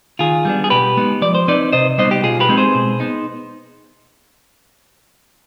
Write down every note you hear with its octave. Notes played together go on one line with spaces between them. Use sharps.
D#3 F4 G#4
G3 B3 D4
G#4
B2 G4 B4
G#3 B3 D#4
F3 D5
C5
C4 D#4 B4 D5
C3 C5 D#5
G3 B3 D#4 C5 D#5
G4
B2 F4 G#4
G4 B4
G#3 C4 D#4
G#4 C5
B2
B3 D#4